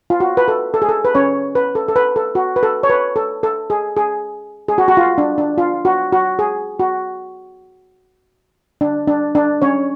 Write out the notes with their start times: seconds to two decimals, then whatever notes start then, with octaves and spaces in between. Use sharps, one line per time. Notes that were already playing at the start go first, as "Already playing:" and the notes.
0.10 F4
0.20 F#4
0.37 B4
0.48 A4
0.74 A4
0.82 G#4
0.89 A4
1.05 B4
1.15 C#4 C#5
1.55 B4
1.75 A4
1.88 A4
1.96 B4
2.16 A4
2.35 F#4
2.56 B4
2.63 A4
2.83 C#5
2.90 B4
3.16 A4
3.43 A4
3.70 G#4
3.97 G#4
4.68 G#4
4.78 F#4
4.88 F#4
4.97 F4
5.18 D4
5.38 D4
5.58 F4
5.85 F#4
6.12 F#4
6.39 G#4
6.80 F#4
8.81 D4
9.08 D4
9.35 D4
9.62 C#4 C#5